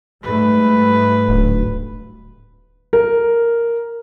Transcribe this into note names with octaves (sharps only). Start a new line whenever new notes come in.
G#2 G3 A3 B4
D1
A#4